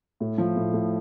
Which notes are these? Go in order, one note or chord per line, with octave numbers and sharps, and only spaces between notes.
A2
F3
A2
A2